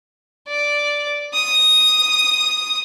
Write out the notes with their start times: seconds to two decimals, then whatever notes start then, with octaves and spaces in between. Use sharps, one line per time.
0.48 D5
1.34 D#6